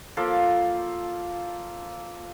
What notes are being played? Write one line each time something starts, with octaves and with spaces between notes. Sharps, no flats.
F3 A#3 A4 F5